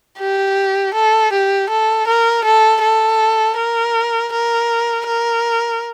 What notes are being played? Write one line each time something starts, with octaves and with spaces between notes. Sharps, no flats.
G4
A4
G4
A4
A#4
A4
A4
A#4
A#4
A#4